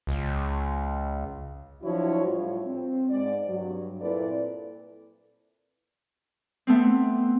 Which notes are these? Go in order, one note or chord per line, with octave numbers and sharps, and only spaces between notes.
C#2
F3 F#3 D4 E4 F#4 C#5
A2 G3 F4
C4
G#2 D5
G2 F#3
A#2 C4 E4 A4 B4 D5
A3 B3 C4